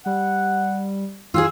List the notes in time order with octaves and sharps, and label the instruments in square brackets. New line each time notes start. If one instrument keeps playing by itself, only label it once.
[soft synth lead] G3 [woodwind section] F#5
[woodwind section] F#2 A2 [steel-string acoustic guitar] F4 G4 G#4 [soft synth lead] E6